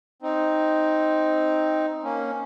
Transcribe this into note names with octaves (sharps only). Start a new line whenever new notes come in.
C4 D#4
A#3 C#4